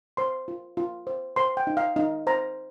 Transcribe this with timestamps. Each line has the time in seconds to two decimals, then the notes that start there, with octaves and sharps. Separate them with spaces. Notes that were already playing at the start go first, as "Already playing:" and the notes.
0.17 C5 C6
0.48 F4
0.77 F4
1.07 C5
1.36 C5 C6
1.57 G5
1.67 D#4
1.77 F5
1.96 D#4
2.27 C5 A#5